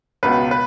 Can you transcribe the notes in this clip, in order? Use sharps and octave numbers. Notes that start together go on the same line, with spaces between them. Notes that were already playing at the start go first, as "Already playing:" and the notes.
C#2 B2 B3 B4
B4